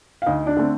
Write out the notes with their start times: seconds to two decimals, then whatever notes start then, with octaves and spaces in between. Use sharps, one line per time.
0.22 F5
0.26 D2 D#4 D#5
0.46 D4 D5
0.57 D3 A3 C4